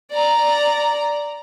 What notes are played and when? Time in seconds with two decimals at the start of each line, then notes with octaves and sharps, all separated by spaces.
0.11 D5 A#5